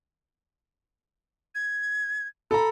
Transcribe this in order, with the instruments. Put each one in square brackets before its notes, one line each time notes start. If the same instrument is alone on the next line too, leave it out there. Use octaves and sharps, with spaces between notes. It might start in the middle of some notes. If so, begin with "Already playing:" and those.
[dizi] G#6
[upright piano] A4 A#5 [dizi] B5